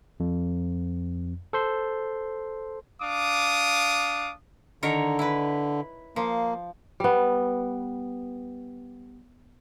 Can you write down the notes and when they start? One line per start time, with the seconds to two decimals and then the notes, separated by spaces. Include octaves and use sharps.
0.20 F2
1.53 A4 C5 C6
3.02 D4 F5 D6 D#6
4.83 D3 D#3 A#4 C#5
5.19 E4 B4
6.16 F3 A#3
7.00 G3 B3